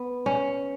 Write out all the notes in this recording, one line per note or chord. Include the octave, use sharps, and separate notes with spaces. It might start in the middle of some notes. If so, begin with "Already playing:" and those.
Already playing: B3
C#4